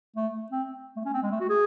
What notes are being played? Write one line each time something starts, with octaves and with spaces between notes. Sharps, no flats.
A3
C4
A3
C#4
C4
G#3
A3
F#4
G#4